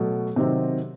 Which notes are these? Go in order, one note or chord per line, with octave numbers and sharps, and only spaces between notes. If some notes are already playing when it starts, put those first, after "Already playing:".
Already playing: B2 F#3 A3
C3 D#3 F#3 C4